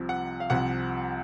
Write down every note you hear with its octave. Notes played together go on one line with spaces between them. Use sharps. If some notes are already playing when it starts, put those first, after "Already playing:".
Already playing: C2 C3 F3
F#5
F5
C2 C3 F3 F#5